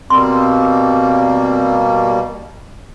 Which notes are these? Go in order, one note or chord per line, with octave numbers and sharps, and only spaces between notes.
B2 G3 A#3 C4 C6